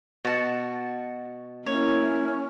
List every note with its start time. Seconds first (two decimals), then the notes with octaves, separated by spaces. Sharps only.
0.25 B2 F#4 A5
1.66 A#3 C#4 E4 C#5